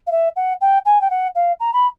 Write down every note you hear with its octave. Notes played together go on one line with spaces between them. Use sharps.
F5
E5
F#5
G5
G#5
G5
F#5
F5
A#5
B5